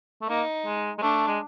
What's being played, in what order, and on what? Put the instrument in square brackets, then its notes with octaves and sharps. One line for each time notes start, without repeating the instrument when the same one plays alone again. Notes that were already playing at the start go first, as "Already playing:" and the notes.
[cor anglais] A3
[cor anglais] A#3 [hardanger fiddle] D#4
[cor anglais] G#3
G#3
[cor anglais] A3 [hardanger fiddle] D4
[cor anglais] G#3